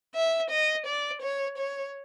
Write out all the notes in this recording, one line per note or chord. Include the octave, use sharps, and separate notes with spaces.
E5
D#5
D5
C#5
C#5